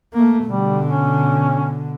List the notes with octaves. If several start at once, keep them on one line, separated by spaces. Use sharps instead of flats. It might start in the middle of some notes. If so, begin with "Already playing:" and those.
A3 A#3
B2 D3 G3
C#4